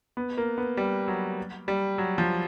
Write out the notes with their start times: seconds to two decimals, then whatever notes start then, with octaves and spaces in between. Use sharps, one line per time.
0.17 B3
0.37 A#3
0.58 B3
0.77 G3
1.08 F#3
1.68 G3
1.98 F#3
2.18 F3